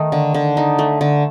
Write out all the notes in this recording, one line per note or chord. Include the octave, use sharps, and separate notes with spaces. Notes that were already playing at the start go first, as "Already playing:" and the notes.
Already playing: D#3 A3 D#4
D3
D3
D#4
A3
D3